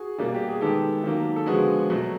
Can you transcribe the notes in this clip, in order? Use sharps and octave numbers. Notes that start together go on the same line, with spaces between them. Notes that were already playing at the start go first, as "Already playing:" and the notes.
Already playing: F#4 G#4
B2 G3 A#3
G4
G#4
D#3 G#3 B3 G4 A4
D#3 F#3 A#3
A4
D3 F3 G#3 B3 F#4 G#4
B2 F#3 A3